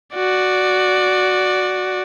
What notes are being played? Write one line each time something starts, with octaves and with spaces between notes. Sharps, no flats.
F#4 D5